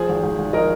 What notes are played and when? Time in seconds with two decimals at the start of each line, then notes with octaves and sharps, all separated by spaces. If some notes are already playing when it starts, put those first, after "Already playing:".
Already playing: F1 F3 G#4 C5
0.09 G#1
0.23 G#1
0.38 G#1
0.53 F3 A#4 D#5